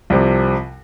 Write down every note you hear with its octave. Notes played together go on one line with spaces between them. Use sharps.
C2 C3 F3